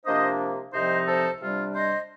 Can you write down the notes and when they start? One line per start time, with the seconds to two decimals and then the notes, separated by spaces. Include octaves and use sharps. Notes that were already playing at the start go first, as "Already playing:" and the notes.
0.05 C3 F3 A#3 D4 C5 D#5
0.73 C2 C3 F3 C4 D#4 C5 D#5
1.07 A4 C5
1.41 C3 G3 D4 F4
1.74 C5 D#5